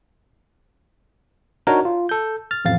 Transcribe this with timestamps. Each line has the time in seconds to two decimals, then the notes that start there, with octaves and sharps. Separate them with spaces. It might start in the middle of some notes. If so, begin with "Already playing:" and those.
1.67 D4 D#4 F#4 A#4 C#5 A#5
1.85 F4
2.09 A4 G6
2.51 F6 A6
2.65 A1 F2 F5 A6